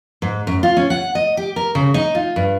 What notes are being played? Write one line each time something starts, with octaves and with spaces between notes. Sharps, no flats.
G#2
F#2
F4
C#4
F#5
D#5
G4
A#4
C#3
D#4
F4
G2